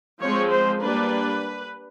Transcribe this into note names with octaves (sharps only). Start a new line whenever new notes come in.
F3 G#3 C4 C#5
C5
G3 A#3 D4 B4